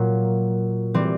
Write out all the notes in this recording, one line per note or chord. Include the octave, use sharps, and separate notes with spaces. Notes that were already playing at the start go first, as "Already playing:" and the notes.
Already playing: A#2 F#3 A#3
E3 G3 C4